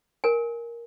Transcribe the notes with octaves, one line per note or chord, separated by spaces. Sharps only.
A#4 G#5